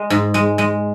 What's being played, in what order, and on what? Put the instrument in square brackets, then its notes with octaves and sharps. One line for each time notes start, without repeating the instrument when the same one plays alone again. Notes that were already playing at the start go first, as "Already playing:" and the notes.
Already playing: [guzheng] G#3
G#2
G#3
G#3